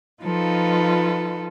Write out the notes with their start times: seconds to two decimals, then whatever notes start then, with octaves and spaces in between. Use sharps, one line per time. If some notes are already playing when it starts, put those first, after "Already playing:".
0.23 F3 D#4 F4 A4 B4